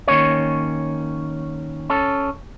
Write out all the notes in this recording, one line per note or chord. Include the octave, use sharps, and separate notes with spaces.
D#3 A#3 C#4 C#5
C#4 A4